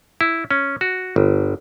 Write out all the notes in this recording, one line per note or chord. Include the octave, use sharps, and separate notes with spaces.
E4
C#4
F#4
G1